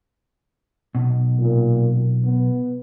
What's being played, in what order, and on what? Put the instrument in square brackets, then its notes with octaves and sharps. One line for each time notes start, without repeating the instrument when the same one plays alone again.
[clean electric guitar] B1 B2
[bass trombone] A#2
B3